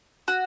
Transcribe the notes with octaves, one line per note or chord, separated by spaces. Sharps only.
F#4